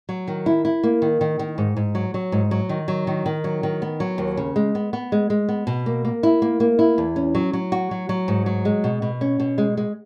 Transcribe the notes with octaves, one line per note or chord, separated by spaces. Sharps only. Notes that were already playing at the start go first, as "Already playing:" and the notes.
F#3
D#3
E4
E4
A#3
D#3
D#3
D#3
G#2
G#2
F#3
F#3
G#2
F#3
D#3
F#3
D#3
D#3
F#3
D#3
B3
F#3
D#2
C#3
G#3
B3
B3
G#3
G#3
B3
B2
A#3
A#3
E4
A#3
A#3
E4
E2
C#4
F#3
F#3
F#4
F#3
F#3
G#2
F#3
G#3
B2
B2
C#4
B2
G#3
G#3